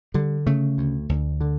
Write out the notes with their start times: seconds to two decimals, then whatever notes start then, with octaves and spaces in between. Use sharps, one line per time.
0.14 D3 G3
0.46 C#3 A3
0.78 D2
1.09 D2
1.41 D3